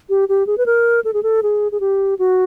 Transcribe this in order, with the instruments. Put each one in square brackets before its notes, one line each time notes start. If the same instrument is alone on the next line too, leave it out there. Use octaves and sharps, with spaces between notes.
[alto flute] G4
G4
G#4
B4
A#4
A4
G#4
A4
G#4
G#4
G4
F#4